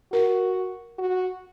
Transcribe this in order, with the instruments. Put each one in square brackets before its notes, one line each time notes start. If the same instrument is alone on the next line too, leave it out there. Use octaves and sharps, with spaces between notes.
[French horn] F#4 [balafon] A#4
[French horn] F#4